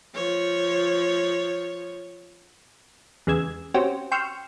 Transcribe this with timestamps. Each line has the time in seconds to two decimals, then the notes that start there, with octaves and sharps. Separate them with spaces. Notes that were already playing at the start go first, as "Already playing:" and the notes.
0.14 F3 C#5
3.27 E2 C#3 G#3 E6 G#6
3.74 C4 C#4 F#4 G4 C5
4.12 G5 C6 C#6 E6 F6